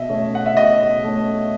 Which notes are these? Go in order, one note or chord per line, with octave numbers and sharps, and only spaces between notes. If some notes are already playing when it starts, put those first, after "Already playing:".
Already playing: B2 D#5 E5
A3 C#4
F#5
E5
B2 D#5
A3 C#4